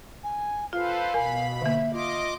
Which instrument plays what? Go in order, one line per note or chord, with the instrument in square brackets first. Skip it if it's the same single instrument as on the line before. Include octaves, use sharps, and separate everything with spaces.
[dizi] G#5
[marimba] F4 [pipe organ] A4 B4 C5 [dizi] F5
[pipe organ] B2 B5 [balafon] A#4 [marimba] G#5
[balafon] D3 A#3 [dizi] E5
[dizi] F4 [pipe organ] D#5 D6